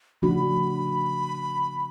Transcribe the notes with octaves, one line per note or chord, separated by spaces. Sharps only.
C#3 F3 A3 D4 F#4 B5